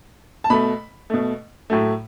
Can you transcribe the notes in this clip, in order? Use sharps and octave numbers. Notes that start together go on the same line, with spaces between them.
A5
B2 A3 B5
B2 A3
A2 F#3 A3